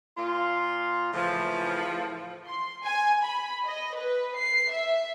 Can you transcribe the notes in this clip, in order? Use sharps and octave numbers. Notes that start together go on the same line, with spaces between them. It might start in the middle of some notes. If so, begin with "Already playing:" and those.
A#2 F4
A2 C#3 E3 F3
C6
G#5
B5
D#5
B4
C7
E5